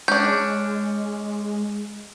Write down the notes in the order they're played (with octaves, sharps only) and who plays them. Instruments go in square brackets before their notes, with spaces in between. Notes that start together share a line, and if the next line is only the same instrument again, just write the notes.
[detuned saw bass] G#3 [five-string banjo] C#4 D4 [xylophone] G6